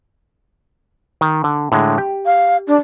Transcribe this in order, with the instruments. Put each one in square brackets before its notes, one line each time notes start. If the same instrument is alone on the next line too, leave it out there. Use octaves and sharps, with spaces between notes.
[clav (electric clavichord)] D#3
D3
A2 D3 G#3
G4
[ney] F5
D4